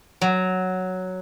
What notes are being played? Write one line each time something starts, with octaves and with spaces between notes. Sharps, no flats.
F#3